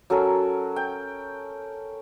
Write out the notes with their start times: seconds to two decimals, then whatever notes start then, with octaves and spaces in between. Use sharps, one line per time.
0.10 F#3 C#4 A4 A#4
0.76 G5